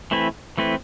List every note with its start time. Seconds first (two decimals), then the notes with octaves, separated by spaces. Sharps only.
0.11 E3 A3 C4 E4 B4
0.57 E3 A3 C4 E4 B4